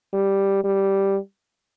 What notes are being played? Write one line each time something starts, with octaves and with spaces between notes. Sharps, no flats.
G3
G3